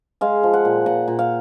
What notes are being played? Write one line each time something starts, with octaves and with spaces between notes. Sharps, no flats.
G#3 F5
F3
F#5
A#2
A#2 F#5
A#2
F5